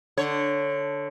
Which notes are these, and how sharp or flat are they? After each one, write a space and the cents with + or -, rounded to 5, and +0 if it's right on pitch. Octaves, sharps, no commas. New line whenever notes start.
D3 +0 C#5 +0